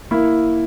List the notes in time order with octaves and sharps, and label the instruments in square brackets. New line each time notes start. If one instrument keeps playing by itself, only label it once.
[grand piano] A#3 E4